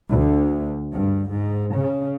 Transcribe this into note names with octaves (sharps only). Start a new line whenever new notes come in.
D2
G2
G#2
C#3